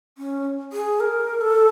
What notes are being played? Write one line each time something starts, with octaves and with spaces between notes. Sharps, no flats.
C#4
G#4
A#4
A4